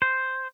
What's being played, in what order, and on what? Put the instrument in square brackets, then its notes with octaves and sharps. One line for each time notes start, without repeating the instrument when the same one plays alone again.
[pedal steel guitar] C5